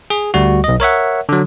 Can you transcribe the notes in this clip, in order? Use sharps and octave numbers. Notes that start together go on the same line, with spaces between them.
G#4
D2 G3 F#4
B1 D#5
A#4 C#5 E5 F#5
D3 F#3